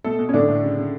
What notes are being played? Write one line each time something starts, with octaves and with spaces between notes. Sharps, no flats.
B2 A3 A4
B2
C#4
A2 D3 D4
A2
C#3
C#3